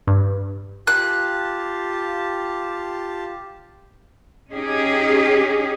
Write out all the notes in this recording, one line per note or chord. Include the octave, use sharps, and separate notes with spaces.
G2
F4 G4 A5 F#6
C#4 D#4 G4 G#4